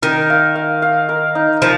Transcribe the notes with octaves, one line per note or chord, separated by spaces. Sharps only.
D#3 A#4
F5
F5
F5
A#4
D#4
F3 A#4